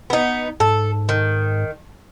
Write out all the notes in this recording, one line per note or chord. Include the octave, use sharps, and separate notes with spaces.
B3 D#4
G#2 A4
D#3